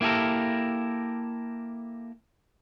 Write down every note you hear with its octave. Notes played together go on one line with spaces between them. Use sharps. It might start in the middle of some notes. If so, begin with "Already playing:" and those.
A#3 E4 G4 A4 A#4